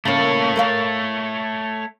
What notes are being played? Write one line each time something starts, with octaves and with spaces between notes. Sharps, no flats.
C#3 A3 A#3 C#5
A#4 C5 F5